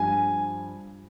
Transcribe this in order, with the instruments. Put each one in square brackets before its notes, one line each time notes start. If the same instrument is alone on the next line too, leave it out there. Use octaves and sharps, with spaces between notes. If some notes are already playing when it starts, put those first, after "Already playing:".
Already playing: [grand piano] G2 F3 G#5